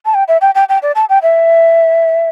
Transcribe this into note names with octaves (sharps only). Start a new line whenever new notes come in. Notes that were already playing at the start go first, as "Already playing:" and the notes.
A5
G5
E5
G5
G5
G5
D5
A5
G5
E5